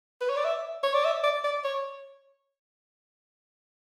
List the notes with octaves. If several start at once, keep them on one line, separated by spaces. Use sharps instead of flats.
B4
C#5
D5
E5
C#5
D5
E5
D5
D5
C#5